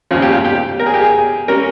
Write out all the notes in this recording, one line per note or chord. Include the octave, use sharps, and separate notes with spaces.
D#2 C#3 F3 F4
G4
F4
G4
A#4
G#4
G4
G#4
G3 C#4 A#4